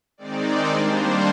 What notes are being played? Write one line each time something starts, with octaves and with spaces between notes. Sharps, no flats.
D#3 G#3 C4 D#4 D5
D#3 G3 A#3 D4 C5